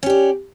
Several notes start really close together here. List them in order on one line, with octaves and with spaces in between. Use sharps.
C#4 G4 D5